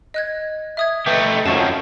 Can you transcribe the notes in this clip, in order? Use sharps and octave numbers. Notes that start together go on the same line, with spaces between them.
D#5 F#6 G#6
E5 D#6 G#6
A3 G4 B4 D#5
F#2 F3 A5 C#6